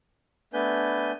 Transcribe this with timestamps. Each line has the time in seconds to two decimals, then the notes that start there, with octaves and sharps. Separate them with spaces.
0.53 A3 B3 D4 B4 G#5 G6